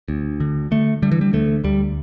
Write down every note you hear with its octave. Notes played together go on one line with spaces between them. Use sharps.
D2
D3
D3 A3
D3 G3
E3
G3
D2 A3
D2 G3